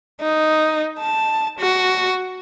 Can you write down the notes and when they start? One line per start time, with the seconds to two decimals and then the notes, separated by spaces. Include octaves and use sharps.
0.21 D#4
1.00 A5
1.59 F#4